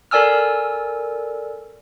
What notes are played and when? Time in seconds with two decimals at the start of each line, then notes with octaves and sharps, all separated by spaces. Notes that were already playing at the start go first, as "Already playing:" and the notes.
0.11 A4 A#4 D5 G#5 E6 F6